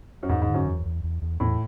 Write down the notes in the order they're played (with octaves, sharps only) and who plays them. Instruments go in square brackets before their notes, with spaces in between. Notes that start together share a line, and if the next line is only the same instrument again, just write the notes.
[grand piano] F#2
[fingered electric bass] E2 [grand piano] G#2
[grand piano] G#2
[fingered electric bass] D3
[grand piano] F#2
[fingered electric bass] E2
E2
E2
E2
[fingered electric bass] E2 [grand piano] A2